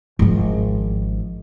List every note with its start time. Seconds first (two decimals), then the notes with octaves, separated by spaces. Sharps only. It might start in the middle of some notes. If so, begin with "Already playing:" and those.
0.19 G#1 F3